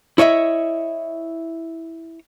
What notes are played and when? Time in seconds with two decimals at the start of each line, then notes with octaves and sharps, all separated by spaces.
0.18 E4 C#5 D#5 E5